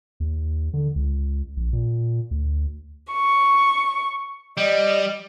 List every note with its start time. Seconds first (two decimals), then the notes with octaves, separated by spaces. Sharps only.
0.20 D#2
0.73 D3
0.96 C#2
1.57 A#1
1.73 A#2
2.31 D2
3.12 C#6
4.57 G3 D5 D#5